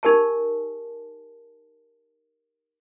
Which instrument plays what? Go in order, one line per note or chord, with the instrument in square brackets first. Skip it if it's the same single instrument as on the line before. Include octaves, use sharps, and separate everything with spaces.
[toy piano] D#4 G4 A#4 G#5 A5